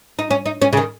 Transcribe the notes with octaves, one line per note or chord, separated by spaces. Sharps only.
D#4
C#4
D#4
C#4
C#3
D#3